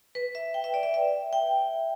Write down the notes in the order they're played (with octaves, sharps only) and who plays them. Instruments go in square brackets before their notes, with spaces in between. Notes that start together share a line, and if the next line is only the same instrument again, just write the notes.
[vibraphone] B4
E5
G5
E5
D5
E5
E5
G5